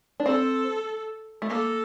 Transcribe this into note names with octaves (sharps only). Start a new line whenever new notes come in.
D4
C4 A4
A3
A#3 A4